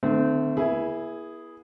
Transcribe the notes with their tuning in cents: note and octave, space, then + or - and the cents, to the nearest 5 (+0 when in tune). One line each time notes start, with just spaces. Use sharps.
D3 +45 A3 +5 C4 -30
B3 -35 E4 +0 G#4 +0